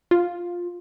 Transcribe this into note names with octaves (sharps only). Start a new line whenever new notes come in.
F4